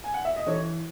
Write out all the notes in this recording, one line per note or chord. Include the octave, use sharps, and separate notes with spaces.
G#5
F#5
E5
D#5
E3 A4 C#5